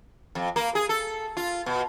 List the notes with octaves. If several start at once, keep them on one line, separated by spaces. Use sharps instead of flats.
F2
A#3
G#4
A4
F4
B2